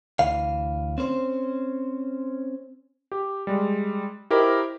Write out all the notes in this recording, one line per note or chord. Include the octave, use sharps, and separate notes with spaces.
D2 E3 F5
C4 C#4 C5
G4
G3 G#3
E4 G4 A#4 C5 D#5